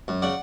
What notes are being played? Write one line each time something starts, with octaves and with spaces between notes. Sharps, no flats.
F#2
C#3 D5 F#5